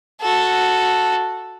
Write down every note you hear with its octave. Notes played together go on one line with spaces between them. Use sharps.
F#4 A4